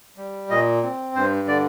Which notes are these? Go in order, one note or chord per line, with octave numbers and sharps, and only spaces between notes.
G3
A#2 D#5
C4
G2 C5
D3 D5